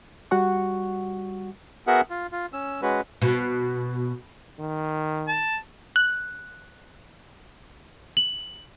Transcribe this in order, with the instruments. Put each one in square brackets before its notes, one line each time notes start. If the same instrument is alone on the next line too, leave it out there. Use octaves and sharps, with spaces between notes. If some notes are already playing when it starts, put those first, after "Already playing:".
[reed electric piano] G3 F#4 F#5 C#6
[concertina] B3 F#4 G#4 A#4 E5 F#5
F4
F4
C#4 E6
G#3 C#4 F#4 B4
[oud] B2
[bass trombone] D#3
[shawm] A5
[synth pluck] F#6
[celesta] F#7